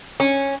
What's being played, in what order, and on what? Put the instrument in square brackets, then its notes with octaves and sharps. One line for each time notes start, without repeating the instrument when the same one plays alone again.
[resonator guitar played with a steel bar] C#4